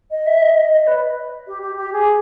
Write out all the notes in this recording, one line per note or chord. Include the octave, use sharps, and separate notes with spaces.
D#5
E5
D#5
D#5
D#5
B4
G4
G4
G4
G#4